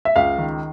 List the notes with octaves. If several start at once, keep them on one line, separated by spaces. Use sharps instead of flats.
E5
C#2 F5
D#3